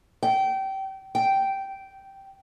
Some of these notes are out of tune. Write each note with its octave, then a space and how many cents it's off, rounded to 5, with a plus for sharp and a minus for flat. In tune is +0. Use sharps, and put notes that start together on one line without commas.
G5 -25
G5 -10